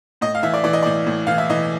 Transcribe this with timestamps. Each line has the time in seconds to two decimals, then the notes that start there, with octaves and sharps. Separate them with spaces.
0.21 A2 D#5
0.35 F5
0.43 E3 E5
0.53 D5
0.64 E3 D5
0.73 D#5
0.83 A2 D5
1.06 A2
1.27 E3 F5
1.38 E5
1.50 E3 D#5